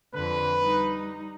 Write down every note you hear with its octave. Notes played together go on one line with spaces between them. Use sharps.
F2 D3 B4
G3 D#4